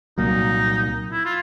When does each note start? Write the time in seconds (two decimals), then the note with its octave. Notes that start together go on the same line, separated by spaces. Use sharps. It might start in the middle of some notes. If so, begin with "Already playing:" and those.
0.18 C2 A#2 F#3 A#3 D#4
1.11 E4
1.25 F4